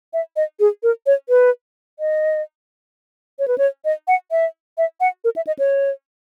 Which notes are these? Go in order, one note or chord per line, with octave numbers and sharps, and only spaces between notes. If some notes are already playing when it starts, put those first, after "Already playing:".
E5
D#5
G#4
A#4
C#5
B4
D#5
C#5
B4
C#5
D#5
F#5
E5
E5
F#5
A#4
E5
D#5
C#5